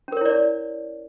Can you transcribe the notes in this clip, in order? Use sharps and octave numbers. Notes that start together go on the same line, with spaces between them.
C#4 E4 A#4 C#5 D5